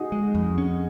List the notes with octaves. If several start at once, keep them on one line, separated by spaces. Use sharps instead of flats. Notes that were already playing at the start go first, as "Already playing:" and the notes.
Already playing: D#4 F#4 G#4
G#3
F2
C#4